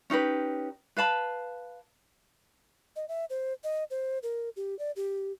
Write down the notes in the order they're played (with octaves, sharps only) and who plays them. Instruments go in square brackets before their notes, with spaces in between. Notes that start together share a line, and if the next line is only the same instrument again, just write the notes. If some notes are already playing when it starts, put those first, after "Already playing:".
[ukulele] C#4 D#4 G4 B4
B4 F5 A5 B5
[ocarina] D#5
E5
C5
D#5
C5
A#4
G4
D5
G4